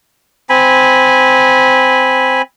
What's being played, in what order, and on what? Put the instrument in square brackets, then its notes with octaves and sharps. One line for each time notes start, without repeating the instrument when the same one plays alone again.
[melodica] C4 G#5 B5